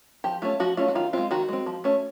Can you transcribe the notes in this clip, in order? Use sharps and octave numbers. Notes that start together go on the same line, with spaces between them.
F3 G4
A3 C#4 F4
F3 F#4
A3 C#4 F4
F#4
D#3 F4
G#3 C4 F4
D#3 F#4
G#3 C4
F3
A3 C#4